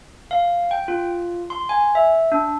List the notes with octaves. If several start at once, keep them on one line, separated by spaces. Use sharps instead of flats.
F5
G5
F4
C6
G#5
E5
D4